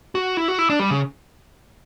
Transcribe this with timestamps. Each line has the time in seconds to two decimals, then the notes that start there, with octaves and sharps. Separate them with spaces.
0.15 F#4
0.37 E4
0.48 F#4
0.59 E4
0.70 D4
0.79 G3
0.91 C#3